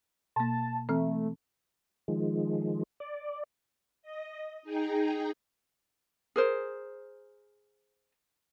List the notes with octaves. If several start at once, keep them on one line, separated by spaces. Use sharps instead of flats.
B2 A#3 A5
E3 A3 C4
D#3 F3 G#3
D5
D#5
D#4 G#4 G5 A#5
G#4 A#4 C5